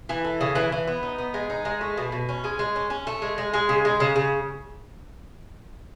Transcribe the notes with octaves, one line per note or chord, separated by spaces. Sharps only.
E3
A4
C#3
E3
E3
B3
D#4
B3
G#3
D#4
G#3
A3
B2
B2
C#4
G#3
G#3
C#4
C#4
A3
G#3
G#3
G#3
C#3
G#3
C#3
C#3